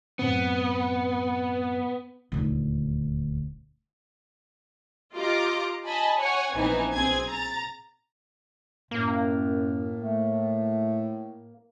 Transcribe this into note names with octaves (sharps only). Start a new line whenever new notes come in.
F#2 A2 B3 C4
D#1 D2
F4 G4 D#5 A#5 D6
D#5 G#5 A5 B5
C#5 F#5 G#5 C#6
A#1 E3 B3 C4 D#4 G#5
B1 C4 G#4 G#5 G#6
A#5 A6
F#2 A2 A#3
A3